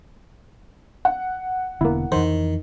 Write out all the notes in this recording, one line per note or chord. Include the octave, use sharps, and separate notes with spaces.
F#5
E1 D3 A#3 B3 E4
F2 D#3 E3 C5